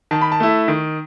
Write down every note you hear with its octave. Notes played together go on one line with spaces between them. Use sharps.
D#3 A5
B5
A5
A3 E4
D#3